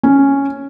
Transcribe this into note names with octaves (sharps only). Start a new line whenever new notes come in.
C#4